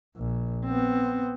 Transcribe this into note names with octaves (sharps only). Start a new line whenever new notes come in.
A#1
B3 C4